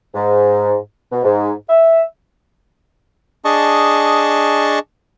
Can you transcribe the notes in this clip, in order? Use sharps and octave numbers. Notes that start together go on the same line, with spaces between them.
G#2
B2
G#2
E5
D4 G#4 D#5 A5 C#6